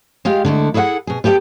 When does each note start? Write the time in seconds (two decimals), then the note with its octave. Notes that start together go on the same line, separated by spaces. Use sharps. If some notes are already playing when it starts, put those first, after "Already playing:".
0.25 G#3 F4 G4 F5
0.45 D3 G#3 A3 E4
0.74 E4 G#4 A4 E5 F#5
1.07 B2 G#4
1.24 B3 G4 A4 F5 G5